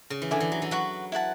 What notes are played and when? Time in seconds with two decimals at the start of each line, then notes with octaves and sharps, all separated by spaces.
0.10 C#3
0.22 E3
0.31 D3 E4 G#4 D5 G#5
0.40 E3
0.52 F#3
0.62 E3
0.71 F#3 B4 F#5 C#6
1.12 E4 B4 F#5 A5